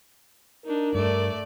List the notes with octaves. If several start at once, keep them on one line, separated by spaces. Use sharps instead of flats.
D4 D#4 A#4
G2 A3 D5